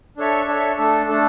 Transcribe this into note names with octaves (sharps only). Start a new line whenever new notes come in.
D4 A4 C#5 E5
D4 A4 C#5 E5
A3 D4 A4
A3 D4 A4